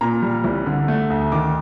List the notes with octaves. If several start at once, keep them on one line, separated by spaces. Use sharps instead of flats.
A#2 A#5
G3
C2
D3
A3
D2
D#3 D6